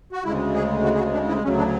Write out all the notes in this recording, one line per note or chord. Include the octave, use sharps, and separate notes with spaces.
F#4
D2 C#3 G#3 E4
G#4
F#4
G#4
F#4
D4
E4
D2 C#3 F#3 C#4
D4